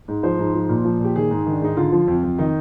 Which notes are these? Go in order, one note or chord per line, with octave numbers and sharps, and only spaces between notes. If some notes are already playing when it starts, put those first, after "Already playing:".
G#2
F3 C5
G#2
F3
A#2
F3
A#2 G4
D#3 G#4
G#2
D#3
D4
G#2 D#4
D3 F4
F3
F2
F2
D#3 D#4